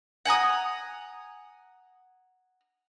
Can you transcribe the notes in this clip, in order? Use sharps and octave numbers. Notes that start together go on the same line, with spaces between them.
F#5 G#5 A#5 D#6